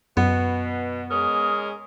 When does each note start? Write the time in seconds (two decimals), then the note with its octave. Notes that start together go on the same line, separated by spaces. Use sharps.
0.17 F#2 B2 B3
1.11 G#3 C#4 A#4 D#6